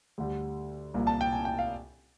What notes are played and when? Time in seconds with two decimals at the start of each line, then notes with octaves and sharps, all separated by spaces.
0.18 D2 D3 G3
0.94 C2 A#2 F3 A#3
1.07 A5
1.21 G5
1.33 G#5
1.45 G5
1.59 F5